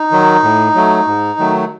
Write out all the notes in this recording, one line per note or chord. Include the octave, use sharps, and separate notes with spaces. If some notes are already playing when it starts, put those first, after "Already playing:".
Already playing: D#4
D#3 F#3
A2
F#3 A3
G#2
D#3 F#3 A3